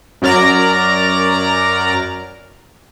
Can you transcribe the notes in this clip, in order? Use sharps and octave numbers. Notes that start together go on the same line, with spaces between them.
F#2 F#3 A#4 D5 A#5